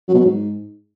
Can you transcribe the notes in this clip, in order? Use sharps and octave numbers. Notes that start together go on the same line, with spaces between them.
F#3
B2
F#3
G#2